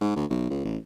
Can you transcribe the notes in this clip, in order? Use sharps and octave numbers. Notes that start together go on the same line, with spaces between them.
G#2
D2
B1
C#2
A1